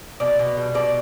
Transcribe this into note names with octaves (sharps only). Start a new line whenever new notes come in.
B2 D5
B2
G3
B2 D5